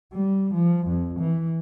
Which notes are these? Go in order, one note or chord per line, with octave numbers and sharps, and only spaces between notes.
G3
F3
F2
E3